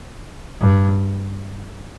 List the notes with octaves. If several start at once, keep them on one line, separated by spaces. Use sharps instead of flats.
G2